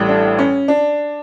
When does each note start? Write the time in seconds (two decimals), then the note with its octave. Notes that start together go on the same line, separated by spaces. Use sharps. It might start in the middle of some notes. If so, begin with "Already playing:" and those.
Already playing: A1 A2 G3
0.09 D4
0.39 C#4
0.68 D4